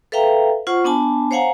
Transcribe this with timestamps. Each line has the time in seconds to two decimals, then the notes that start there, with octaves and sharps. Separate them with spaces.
0.12 A4 B4 E5 F5 G5 A#5
0.67 F4 C5 F#5 C#6
0.84 B3 D4 G#5 A5
1.31 C5 C#5 F5 F#5 G#5 A#5